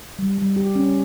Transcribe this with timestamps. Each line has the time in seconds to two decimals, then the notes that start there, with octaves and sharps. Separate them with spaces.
0.19 G3
0.38 G3
0.56 G4
0.75 C#4